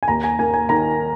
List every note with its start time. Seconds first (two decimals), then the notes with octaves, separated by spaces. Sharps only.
0.03 G#5
0.08 D#2 A#5
0.24 G#5
0.39 A#3 G#5
0.54 G#5
0.69 D#3 A#5